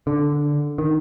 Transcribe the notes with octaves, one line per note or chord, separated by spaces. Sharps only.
D3
D#3